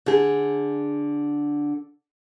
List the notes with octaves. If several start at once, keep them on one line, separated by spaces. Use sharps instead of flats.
D3 G#4